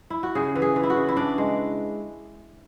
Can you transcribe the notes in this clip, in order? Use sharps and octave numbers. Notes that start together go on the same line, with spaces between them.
E4
F#4
C#3 G#4
E3
G#4
E3
E4
F#4
C#3
E4
E3 D4
G#3